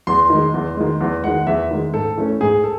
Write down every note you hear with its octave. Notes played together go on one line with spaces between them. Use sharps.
E2 C6
D#3 G#3
E2
D#3 G#3
E2
D#3 G#3 F#5
E2 E5
D#3 G#3
G#2 A4
E3 A3 C#4
G#2 G#4
A4